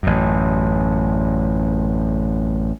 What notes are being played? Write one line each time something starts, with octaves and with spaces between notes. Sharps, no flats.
A1 F#2